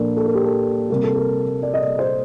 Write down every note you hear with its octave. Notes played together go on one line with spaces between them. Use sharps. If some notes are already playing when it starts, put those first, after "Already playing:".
Already playing: A#2 F3 D4 A4 A#4
A4
A#4
G4
A4
C3 G3 A#3 A#4
A4
A#4
D5
D#5
D5
C5